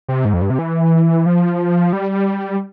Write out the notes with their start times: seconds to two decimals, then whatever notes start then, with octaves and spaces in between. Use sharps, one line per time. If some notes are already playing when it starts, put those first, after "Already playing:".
0.08 C3
0.25 G#2
0.34 F2
0.42 G2
0.50 C3
0.59 E3
1.26 F3
1.93 G3